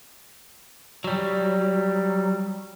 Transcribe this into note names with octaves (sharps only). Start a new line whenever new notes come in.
F#3 G3